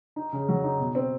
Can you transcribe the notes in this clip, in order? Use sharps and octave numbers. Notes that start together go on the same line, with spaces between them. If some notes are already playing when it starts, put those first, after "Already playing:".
D#4
C#3
F#3
D#4
B2
C4